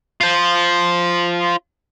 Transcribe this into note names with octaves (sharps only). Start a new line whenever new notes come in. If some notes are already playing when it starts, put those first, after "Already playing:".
F4 C5